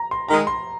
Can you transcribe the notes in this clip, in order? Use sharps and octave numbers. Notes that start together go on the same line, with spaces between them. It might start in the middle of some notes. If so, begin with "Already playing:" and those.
Already playing: A#5
C6
D#3 G#3 A#5
C6